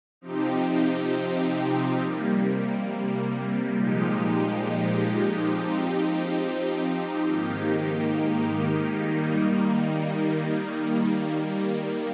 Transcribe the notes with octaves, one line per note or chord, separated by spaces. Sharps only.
C3 F3 C4 D#4 G4
C3 G3 A#3
A#2 F3 G#3 D#4 G4
F3 C4 D#4 G4
G#2 D#3 A#3 D#4 G4
D#3 G3 A#3 D#4
D#3 G3 A#3